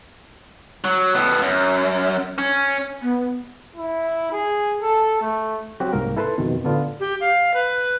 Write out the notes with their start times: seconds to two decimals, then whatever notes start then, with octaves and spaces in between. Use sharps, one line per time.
0.84 F#3
1.15 A2 B3
1.42 F#2
2.38 C#4
3.02 B3
3.76 E4
4.32 G#4
4.82 A4
5.21 A3
5.80 F#3 C4 F#4 G4
5.93 C2 G#2 A#3 A#4
6.17 E4 A4 B4 A5 C6
6.38 F2 B2 D#3
6.64 A2 D3 B3 D4 F4
7.00 G4
7.21 F5
7.54 B4